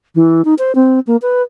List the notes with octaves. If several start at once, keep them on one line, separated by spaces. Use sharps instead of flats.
E3
D#4
C5
C4
A#3
B4